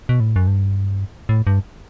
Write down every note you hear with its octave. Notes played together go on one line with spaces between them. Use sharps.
B2
A2
F#2
G2
A2
G2